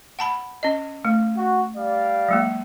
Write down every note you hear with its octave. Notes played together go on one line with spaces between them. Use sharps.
F#5 A5 B5
C#4 D#5
A3
F#4
G3 D5 F5
F#3 G#3 A#3